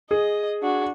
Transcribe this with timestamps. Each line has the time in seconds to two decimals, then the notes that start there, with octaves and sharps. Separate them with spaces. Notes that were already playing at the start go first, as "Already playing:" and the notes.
0.11 G#4 D#5
0.62 D4 F#4